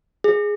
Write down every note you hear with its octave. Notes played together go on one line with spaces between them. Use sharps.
G#4